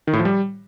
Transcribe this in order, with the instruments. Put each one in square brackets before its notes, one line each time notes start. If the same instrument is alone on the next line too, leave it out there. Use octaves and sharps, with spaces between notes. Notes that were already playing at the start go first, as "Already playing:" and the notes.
[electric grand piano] D#3
A2
F3
G3